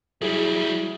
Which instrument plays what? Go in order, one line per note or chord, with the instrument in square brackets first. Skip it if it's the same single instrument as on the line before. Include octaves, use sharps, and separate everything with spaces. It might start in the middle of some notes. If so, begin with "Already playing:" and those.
[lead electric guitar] F#3 G3 [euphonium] E4 [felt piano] G#4